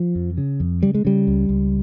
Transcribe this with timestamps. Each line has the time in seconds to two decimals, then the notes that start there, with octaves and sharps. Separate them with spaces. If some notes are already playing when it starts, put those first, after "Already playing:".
Already playing: F3
0.15 F2
0.38 C#3
0.60 F2
0.82 C#3 G3
0.94 G#3
1.05 C#3 G3
1.27 C#2
1.49 C#2